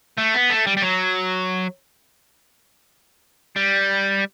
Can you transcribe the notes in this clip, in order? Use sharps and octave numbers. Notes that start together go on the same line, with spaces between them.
A3
B3
A3
G3
G3
F#3
G3